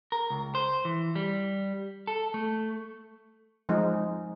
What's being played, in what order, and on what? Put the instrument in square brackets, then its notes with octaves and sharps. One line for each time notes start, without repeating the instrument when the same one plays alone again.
[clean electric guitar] A#4
C#2
C5
E3
G3
A4
A3
[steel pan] F3 G#3 D#4